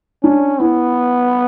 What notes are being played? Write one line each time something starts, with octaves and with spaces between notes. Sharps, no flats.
C#4 D4
B3 E4